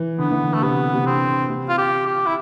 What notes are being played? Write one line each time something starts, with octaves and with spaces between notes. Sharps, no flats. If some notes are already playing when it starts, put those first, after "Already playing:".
Already playing: E3
D3 B3
E3
D3
A3
C3 B3
C3
D3 C4
C3
F4
G4
G4
E4